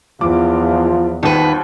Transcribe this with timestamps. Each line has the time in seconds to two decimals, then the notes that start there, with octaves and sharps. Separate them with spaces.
0.21 E2 F3 F4 D6
1.23 D#1 D#2 D#3 B4